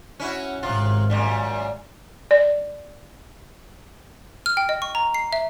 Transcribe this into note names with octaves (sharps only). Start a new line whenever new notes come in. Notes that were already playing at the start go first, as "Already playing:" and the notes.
C#4 E4 F#4
G#1 G#2 C3 F4
F#2 A#2 G3
D5
F6
G5
D#5
C#6
A#5
C7
E5